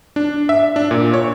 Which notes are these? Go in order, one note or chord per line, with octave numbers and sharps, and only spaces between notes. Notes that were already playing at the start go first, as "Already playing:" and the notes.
D4
E5
D4
A#2
C#5